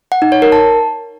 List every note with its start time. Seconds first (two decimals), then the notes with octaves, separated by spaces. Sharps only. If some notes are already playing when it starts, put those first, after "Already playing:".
0.12 F#5
0.22 D#4
0.32 C#5
0.42 A#4
0.52 A5